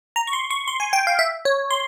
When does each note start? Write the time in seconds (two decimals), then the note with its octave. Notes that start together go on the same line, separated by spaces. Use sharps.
0.16 A#5
0.27 C#6
0.33 C6
0.51 C#6
0.68 C6
0.80 G#5
0.93 G5
1.07 F5
1.19 E5
1.45 C#5
1.71 C6